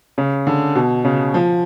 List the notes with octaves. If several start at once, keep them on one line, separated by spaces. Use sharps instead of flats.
C#3
D3
B2
C#3
F3